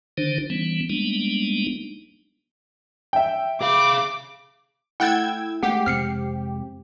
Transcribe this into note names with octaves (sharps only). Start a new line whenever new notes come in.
D3 D#3 D4 D#4 C5
E3 G3 B3 C#4
G3 G#3 A#3 B3 D4 D#4
E5 G5
G#4 F5 D6
A3 E4 F#5 G5 E6 F#6 G#6 A6
G#3 A3 G4 F#5 B6 C7
F2 C3 G#3 C4 F6 C7 C#7